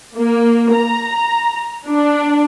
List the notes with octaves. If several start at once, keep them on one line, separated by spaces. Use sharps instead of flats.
A#3
A#5
D4